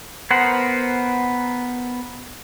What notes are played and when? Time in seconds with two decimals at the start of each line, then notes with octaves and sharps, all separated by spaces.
0.31 B3 A#4 C5 F#5